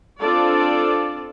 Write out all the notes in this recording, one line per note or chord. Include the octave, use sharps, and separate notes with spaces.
C4 D4 F4 A4 D5